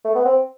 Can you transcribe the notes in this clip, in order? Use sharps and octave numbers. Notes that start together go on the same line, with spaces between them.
A3
B3
C4